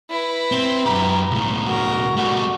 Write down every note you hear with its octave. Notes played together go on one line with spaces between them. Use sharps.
E4 B4
C4
F#2 G4 A#5
C#2 A2
F#4 A#4
G3 A3 F#4